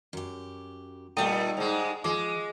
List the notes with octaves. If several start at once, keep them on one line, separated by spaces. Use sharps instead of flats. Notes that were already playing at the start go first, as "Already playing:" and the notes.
F#2 G4
A#2 G3 A3 D#4 E4 G5 D#6 D#7
G#2 G#3
F3 G#3 D6